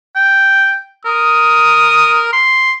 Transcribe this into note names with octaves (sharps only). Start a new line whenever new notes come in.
G5
A#4 D#6
C6